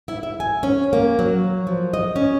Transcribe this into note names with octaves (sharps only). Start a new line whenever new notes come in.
E4
E5
G#5
C#4
A#3
F#3
F3
D#5
C#4